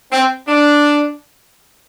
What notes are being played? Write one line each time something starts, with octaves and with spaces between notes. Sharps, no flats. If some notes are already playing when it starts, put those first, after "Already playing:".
C4
D4